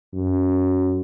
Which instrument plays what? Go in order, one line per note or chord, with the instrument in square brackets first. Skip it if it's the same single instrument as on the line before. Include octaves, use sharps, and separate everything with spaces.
[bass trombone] F#2